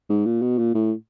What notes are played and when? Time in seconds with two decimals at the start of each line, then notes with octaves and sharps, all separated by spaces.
0.09 G#2
0.26 A#2
0.42 B2
0.58 A#2
0.74 A2